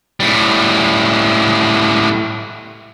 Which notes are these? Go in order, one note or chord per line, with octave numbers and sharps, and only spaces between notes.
A2 G3